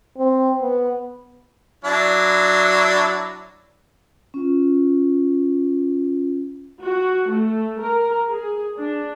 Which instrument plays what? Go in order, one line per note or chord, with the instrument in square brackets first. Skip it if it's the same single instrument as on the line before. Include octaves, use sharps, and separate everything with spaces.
[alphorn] C4
B3
[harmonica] F#3 D4 E4
[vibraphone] C#4 F4
[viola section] F#4
A3
A#4
G#4
D4